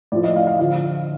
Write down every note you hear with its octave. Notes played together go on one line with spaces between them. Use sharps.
A2 F3 D5
D#5
F5
F5
D3 F3 F5